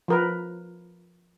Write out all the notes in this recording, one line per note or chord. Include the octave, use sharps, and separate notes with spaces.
F3 A#4 B4